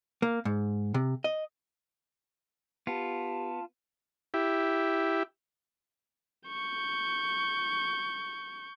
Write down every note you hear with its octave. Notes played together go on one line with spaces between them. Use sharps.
A#3
G#2
C3
D#5
B3 F4 G4 A5
E4 G4
C#6 G6